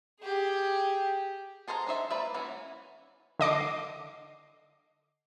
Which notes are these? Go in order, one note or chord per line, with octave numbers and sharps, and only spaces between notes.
G4 G#4
G#4 A4 C5 F5 A#5
D4 D#4 C5 E5
A#3 B4 D5 E5
E3 C#4 F#4
D3 D#5 D6 C7